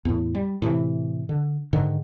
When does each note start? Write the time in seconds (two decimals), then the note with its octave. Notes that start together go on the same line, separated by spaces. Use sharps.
0.05 E2 A2
0.35 G3
0.62 A2 C3 D#3 E3
1.29 D3
1.73 G#2 D3 D#3